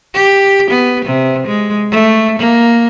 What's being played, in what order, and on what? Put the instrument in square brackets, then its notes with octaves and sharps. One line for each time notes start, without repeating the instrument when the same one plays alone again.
[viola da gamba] G4
B3
C3
G#3
A3
A#3